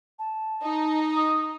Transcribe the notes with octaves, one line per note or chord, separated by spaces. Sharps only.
A5
D#4
D#6